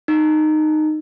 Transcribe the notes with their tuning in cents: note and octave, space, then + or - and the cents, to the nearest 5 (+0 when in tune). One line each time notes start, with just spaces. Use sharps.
D#4 -15